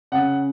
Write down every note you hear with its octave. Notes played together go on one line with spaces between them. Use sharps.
C#3 F#5